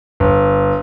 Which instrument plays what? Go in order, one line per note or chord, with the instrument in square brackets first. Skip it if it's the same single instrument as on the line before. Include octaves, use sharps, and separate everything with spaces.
[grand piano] G1